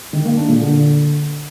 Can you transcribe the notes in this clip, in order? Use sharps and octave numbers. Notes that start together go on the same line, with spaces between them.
D#3
A#3
D4
A#2
D3